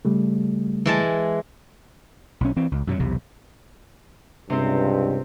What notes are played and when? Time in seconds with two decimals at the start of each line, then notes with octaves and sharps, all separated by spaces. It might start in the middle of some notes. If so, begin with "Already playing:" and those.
0.05 C#3 G3 A3
0.86 E3 G#3 A5
2.41 B1 C#4
2.56 E3 C4
2.72 C#2
2.87 F#2 B2 F#3
2.99 B1 E2 C3
4.50 C#2 G2 C3 C4